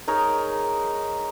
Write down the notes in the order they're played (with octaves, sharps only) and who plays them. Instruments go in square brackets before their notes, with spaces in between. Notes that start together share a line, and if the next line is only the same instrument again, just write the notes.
[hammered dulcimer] D#4 G#4 A#4 C#5